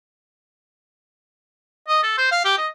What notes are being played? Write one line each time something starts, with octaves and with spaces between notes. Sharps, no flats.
D#5
A4
C5
F5
G4
D#5